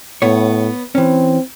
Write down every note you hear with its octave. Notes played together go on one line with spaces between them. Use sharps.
A2 B3 C#5
E3 C4 C#4